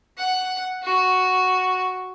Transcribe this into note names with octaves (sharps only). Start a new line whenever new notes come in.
F#5
F#4